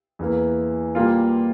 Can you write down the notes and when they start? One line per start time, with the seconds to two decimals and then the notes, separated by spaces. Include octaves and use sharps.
0.19 E2 E3 A#3
0.95 A#2 G3 A#3 F4